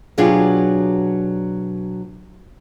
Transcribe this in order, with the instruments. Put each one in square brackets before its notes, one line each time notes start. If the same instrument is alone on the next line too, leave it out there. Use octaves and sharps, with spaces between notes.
[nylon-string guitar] B2 F#3 D4 F4 G4 G#4